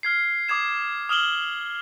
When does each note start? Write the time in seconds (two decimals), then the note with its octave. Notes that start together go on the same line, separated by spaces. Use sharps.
0.03 F6 G#6 C7
0.48 D6 D#6 G#6 E7
1.09 D#6 F6 E7 F#7 G7